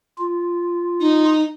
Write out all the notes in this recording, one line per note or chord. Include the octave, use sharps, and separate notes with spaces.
F4
D#4